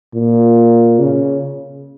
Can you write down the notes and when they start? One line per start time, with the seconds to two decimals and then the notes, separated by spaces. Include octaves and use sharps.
0.15 A#2
0.99 C#3